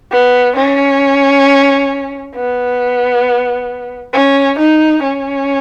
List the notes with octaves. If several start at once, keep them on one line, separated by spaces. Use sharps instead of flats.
B3
C#4
B3
C#4
D#4
C#4